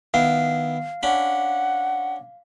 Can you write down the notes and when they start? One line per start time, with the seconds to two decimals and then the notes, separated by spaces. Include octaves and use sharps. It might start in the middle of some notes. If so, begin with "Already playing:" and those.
0.14 D#3 B3 E4 F5
1.03 C#4 D4 F#5 B5